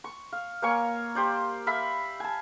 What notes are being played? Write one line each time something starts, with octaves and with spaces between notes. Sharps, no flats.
C#6
F5
A#3 C#5 G#5 C#6
G4 C5 D5
E5 F5 B5
G#5 A5